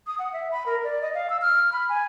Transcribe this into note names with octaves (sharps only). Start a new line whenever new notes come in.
D#6
F#5
E5
B5
A#4
D5
D#5
F5
E6
F6
B5
G#5